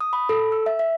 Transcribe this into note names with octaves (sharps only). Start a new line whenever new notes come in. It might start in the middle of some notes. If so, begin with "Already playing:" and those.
D#6
B5
A4
E6
E5
E5